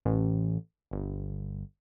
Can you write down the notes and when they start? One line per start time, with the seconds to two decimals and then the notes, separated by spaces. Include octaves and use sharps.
0.05 A1
0.91 G1